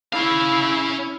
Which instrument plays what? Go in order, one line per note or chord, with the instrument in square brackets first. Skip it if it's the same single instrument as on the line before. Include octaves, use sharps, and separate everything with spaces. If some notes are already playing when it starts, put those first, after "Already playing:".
[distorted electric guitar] C#4 F5 [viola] E4